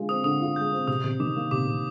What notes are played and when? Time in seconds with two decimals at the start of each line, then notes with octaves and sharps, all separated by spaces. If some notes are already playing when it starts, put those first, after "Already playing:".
Already playing: D3 G#3 F4
0.09 C4 D#6
0.24 D3 D#6
0.40 F4
0.56 G#3 G6
0.72 C4
0.88 C3 D#6
1.04 C3
1.20 D#3 D6
1.36 A#3
1.51 C3 D6
1.67 C3